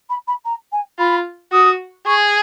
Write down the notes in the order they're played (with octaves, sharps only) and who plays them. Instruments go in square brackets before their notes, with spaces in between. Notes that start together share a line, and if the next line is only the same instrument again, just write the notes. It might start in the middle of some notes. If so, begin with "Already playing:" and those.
[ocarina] B5
B5
A#5
G#5
[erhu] F4 [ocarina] B5
[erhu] F#4 [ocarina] D#6
[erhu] G#4 [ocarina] C#6